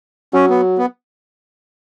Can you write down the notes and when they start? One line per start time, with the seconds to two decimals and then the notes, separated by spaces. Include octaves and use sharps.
0.34 F#3 C#4
0.50 B3
0.78 B3